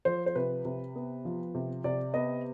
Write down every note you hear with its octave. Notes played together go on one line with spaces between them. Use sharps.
F3 C5
C5
C3 B4
C3
B3
F3
C3
C3 D5
B3 D#5